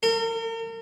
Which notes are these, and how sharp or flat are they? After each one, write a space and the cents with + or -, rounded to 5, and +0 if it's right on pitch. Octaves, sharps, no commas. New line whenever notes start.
A#4 -40